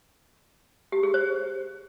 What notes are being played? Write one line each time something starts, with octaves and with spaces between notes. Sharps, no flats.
G4
G#4
C5